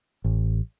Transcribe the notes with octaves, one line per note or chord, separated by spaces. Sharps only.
A1